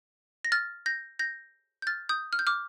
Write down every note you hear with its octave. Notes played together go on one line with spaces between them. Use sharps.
A#6
F6 A6
G6 A#6
G6 A#6
G6
F6 A6
D#6 G6
F6
G6
D6 F6